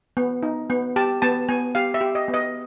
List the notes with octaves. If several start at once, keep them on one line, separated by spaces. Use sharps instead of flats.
B3
D#4
B3
G4 A5
B3 A5
B3 G#5
G4 F5
E5
G4
D#5
B3
D#5